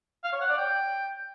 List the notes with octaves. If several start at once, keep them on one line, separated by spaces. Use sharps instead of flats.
F5
C#5
F#5
D5
G5